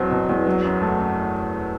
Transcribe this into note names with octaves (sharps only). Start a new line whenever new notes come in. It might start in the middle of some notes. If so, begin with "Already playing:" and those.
Already playing: E2 B2 F#3 C4
B2
E2
F#3
F#2
A3
F#2